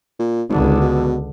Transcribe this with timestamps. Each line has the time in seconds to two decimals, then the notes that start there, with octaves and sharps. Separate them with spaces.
0.20 A#2
0.49 G#1 C#2 D3
0.81 B2